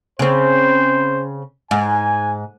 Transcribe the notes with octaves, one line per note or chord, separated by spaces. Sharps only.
C#3 C4 C5
G#2 G#5